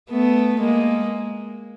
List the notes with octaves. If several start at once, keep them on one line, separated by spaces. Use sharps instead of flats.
A3 B3
G#3 A#3